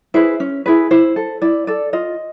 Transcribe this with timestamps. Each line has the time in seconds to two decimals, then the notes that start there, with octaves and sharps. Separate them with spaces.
0.14 E4 G#4 B4 C5
0.40 C#4
0.66 E4 G#4 B4
0.91 E4 C5
1.16 A4
1.42 E4 D5
1.67 A4 D5
1.93 F4 D#5